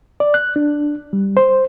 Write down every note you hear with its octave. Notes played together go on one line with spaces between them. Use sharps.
D5
F#6
D4
G3
C5